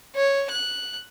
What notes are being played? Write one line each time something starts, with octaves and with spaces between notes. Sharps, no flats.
C#5
F#6